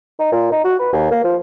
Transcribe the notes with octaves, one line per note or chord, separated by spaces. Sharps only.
D#4
A#2
D#4
F#4
B4
D#2
A#3
F3